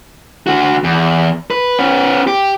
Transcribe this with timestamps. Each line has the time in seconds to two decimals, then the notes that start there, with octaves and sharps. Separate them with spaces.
0.47 D3 F#4
0.84 E2
1.51 B4
1.79 B3 C#4
2.27 G4